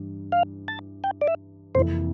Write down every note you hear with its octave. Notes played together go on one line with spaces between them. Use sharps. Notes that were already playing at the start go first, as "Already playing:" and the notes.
Already playing: G2 E3 G3
F5
A5
G5
D5
E5
F2 C3 E3 A#3 E4 C5